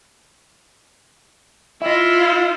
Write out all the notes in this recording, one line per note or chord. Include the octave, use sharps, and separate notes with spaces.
E4 F4 D#5 E5